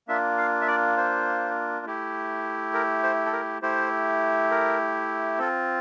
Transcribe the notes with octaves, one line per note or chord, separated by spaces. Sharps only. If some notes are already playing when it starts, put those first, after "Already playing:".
A#3 D4 F4 E5
F5
E5
D5
C5
A3 E4 G4
A#4
C5
A4
A#4
A3 E4 G4 C5
A#4
C4 F4 A4